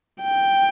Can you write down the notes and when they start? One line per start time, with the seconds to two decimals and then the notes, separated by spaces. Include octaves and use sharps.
0.22 G5